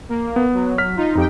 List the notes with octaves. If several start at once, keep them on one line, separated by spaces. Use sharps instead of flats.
A#3
B3
F#3
F6 B6
D#4 F4
F2 D#4 G4 G5